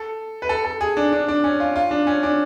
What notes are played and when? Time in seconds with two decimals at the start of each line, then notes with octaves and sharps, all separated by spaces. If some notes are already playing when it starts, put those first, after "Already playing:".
Already playing: A4
0.42 B4
0.49 A4
0.65 A4
0.81 G#4
0.97 D4
1.13 D4
1.28 D4
1.44 C#4
1.60 F4
1.76 F4
1.91 D4
2.07 C#4
2.23 D4